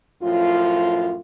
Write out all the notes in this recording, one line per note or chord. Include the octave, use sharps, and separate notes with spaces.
F#2 A2 F3 F4